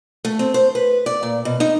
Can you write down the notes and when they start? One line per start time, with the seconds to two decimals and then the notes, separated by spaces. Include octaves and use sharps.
0.25 A3
0.39 C4
0.54 C5
0.75 B4
1.06 D5
1.23 A#2
1.45 B2
1.60 D#4